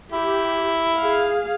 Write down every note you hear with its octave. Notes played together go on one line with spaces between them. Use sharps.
E4 G4
G#4 F5